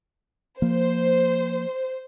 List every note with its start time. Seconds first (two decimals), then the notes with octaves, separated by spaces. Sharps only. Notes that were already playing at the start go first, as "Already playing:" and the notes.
0.62 F3 A#3 C5